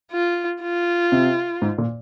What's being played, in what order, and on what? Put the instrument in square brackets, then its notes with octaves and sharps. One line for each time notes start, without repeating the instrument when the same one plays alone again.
[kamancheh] F4
F4
[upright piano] C3
G#2
A#2